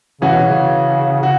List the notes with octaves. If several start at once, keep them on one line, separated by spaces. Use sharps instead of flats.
C#3 E3 C#4 F#4
B2
C#3
C#3 F#4